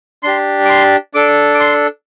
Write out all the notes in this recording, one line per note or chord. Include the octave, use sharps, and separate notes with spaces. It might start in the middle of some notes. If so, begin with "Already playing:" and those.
D4 G4 C6
D6
C6
D4 A4 D6
D6
C6